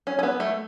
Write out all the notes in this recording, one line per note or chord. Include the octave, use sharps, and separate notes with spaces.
C#4
C#4
B3
A3